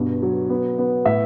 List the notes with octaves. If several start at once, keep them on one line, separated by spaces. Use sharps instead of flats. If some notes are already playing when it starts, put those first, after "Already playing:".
Already playing: G2 B2
F#3
B3
B3
A2 E5